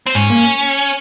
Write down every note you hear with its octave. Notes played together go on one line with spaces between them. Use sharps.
C4
G#2 C#4
A#3